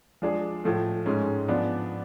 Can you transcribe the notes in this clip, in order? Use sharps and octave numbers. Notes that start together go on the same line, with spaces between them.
F3 G#3 D4 G#4
A2 F3 A3
G#2 G#3 C#4
F3 B3 D4